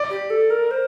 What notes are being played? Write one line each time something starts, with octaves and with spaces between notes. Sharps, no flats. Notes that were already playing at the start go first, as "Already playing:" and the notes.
Already playing: D5
G4
A4
A#4
C5